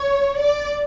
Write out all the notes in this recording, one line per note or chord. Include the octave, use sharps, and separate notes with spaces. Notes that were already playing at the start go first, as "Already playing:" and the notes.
Already playing: C#5
D5